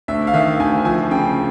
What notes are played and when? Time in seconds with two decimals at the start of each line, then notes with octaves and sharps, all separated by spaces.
0.08 D2 E5
0.27 F5
0.34 D#3 E5
0.60 D2 G#5
0.85 F3 G#5
1.11 C#3 G5